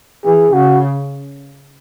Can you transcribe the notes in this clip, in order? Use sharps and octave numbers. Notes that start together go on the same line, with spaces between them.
E3 G#4
C#3 F#4